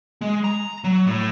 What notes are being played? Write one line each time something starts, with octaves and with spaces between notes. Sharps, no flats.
G#3
A#5
F#3
A2